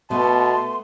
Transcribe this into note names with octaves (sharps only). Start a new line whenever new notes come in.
B2 A3 B3 A5 C6